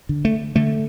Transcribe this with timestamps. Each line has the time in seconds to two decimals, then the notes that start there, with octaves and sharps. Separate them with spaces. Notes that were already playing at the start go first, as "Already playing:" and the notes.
0.09 D3
0.25 A3
0.56 D3 A3